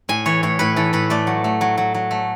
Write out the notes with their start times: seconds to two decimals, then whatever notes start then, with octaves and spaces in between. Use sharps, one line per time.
0.09 A2 G#5
0.26 E3 C#5
0.43 A2 C#5
0.59 A2 B4
0.76 E3 A4
0.93 A2 B4
1.10 A3 D5
1.27 F#3
1.44 A3
1.61 F#3
1.78 F#3
1.95 F#3
2.11 A3